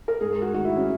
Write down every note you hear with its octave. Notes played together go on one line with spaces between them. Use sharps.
A#4
G#2 G#4
F#4
D#3 F#4
E4
C#4